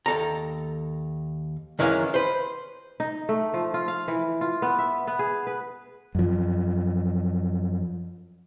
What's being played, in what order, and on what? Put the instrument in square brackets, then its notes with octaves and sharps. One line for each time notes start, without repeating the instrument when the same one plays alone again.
[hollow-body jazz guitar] D#2 A4 A#5
F#2 D#3 E3 G#3 C#4 F5
B4 C5
[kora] D#4
A3
F3
F4
F5
E3
F4
B3
E5
B3
G#4
B4
[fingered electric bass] F#2 F3